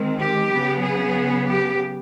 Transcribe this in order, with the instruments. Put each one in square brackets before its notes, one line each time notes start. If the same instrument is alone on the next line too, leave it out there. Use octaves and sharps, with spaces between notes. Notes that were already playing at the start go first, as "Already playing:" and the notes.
Already playing: [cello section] D#3 G#3 C4
G4
C#3 F#3 B3
G#4
G4